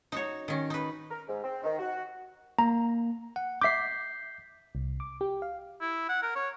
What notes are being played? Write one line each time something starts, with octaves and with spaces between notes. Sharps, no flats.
D#4 F#4 C#5
D#3 C#4
D#4 B4
A#4
G#2
C4
D#3
F#4
A#3 A#5
F#5
E5 D6 G6 B6 C7
C2
D6
G4
F5
E4
F#5
A#4
C#5